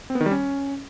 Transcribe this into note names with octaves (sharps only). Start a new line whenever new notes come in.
C4
B3
D#3
G3
C#4